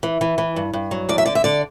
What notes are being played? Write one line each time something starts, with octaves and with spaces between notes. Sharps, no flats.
E3
E3
E3
G2
G2
F#3
E2 D5
E5
D3 D5
E5
D3 D5